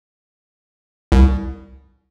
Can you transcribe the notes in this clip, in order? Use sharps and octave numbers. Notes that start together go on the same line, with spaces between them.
C2